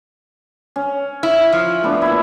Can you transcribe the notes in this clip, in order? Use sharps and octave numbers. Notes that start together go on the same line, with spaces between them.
C#4
E4
F3
A3 B3 D4
A#2 E4